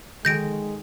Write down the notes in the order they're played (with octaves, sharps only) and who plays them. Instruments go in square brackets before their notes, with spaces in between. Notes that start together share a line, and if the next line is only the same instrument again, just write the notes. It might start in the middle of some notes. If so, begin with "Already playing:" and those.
[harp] D#3 [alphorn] G#3 [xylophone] G6 A#6 D7